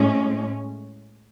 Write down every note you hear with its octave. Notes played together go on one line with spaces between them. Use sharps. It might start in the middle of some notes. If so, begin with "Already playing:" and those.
Already playing: A2 G#3 C#4